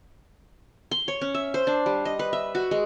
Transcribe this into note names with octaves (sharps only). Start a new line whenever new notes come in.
C6
C#5
C#4
E5
C5
D4
G3
D#5
B4
E5
F#4
G#3